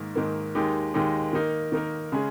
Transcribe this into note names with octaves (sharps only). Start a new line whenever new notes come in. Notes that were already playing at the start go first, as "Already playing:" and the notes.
Already playing: G#2 D#3 A#3
G#2 D#3 A#3
D#2 D#3 G#3 D#4 G4
D#2 D#3 G#3 D#4 G4
D#3 A#3 D#4 A#4
D#3 A#3 D#4 A#4
C#3 G#3 C#4 G#4